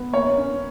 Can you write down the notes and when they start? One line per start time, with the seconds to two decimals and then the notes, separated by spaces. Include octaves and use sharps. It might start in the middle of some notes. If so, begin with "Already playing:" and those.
Already playing: B3
0.13 A#3 C#5
0.37 C#4